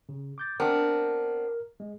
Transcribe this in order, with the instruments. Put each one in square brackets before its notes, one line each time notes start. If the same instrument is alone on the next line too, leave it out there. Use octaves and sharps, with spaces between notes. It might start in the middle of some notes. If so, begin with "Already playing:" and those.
[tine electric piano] C#3
D6 G6 A6
[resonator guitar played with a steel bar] B3 C4 D4 [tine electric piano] A#4
[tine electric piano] G#3